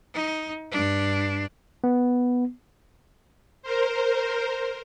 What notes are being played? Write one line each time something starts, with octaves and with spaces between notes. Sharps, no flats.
D#4
G2 D4
B3
A#4 C5